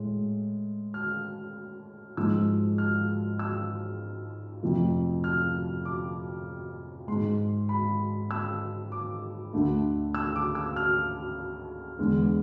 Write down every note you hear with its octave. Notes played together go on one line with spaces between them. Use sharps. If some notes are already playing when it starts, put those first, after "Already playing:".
Already playing: A2 G#3
F6
G#2 F3 G#3 E6
F6
E6
F2 C3 F3 A3
F6
D6
G#2 G#3 C6
B5
E6
D6
D2 D3 A3
E6
D6
E6
F6
E2 D3 G#3